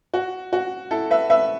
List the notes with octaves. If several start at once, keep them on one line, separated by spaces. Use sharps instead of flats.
F#4
F#4
E4 A4
B4 E5
B4 E5